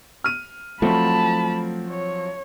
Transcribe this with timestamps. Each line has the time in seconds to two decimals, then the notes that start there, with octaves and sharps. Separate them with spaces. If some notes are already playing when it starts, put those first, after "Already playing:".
0.24 F6 D#7
0.82 F3 F#3 A3 C4 A5 B5
1.90 C#5